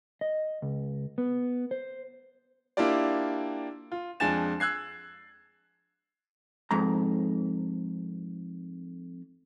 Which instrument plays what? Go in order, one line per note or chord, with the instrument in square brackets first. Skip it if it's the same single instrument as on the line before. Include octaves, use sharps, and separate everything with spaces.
[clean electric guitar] D#5
C#2
B3
C5
[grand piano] A#3 D4 E4 F4 G4 D5
F4
F2 G#3 D4 G#5 A6 E7
E6 F#6 G#6 C7
[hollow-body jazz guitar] F2 G#2 A#5